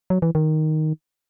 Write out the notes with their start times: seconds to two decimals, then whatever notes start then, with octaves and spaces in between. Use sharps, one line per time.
0.10 F#3
0.22 E3
0.35 D#3